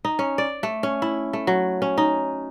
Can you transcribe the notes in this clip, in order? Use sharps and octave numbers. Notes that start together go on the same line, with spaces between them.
D#4
C#4
D5
A3
C#4
E4
A3
F#3
C#4
D#4